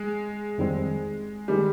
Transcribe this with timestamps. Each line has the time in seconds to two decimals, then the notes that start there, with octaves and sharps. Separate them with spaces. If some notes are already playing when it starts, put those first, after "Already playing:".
Already playing: G#3
0.58 F2 D#3 G3 C4
1.48 D#3 G3 G#3